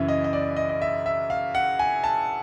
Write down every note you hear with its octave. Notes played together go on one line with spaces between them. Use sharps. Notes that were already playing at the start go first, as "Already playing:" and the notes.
Already playing: F#2 C#3 E3 E5
D#5
D#5
D5
D#5
D#5
E5
E5
F5
F#5
G#5
A5